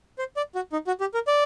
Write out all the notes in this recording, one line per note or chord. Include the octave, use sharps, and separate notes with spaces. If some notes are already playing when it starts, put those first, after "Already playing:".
C5
D5
F#4
D#4
F#4
G4
A#4
D5